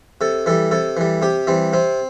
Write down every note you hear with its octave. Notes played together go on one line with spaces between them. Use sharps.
C3 A4
E3 G3 A4
C3 A4
E3 G3
C3 G4
E3 G3 C4
C3 C4